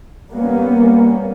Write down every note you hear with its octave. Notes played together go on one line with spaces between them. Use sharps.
G3 A#3 B3 C#4